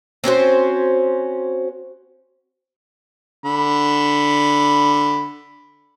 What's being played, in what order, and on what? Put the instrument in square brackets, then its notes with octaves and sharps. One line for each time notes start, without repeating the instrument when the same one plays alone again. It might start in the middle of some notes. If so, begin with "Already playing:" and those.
[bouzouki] C4 C#4 F#4 C5
[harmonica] D3 B5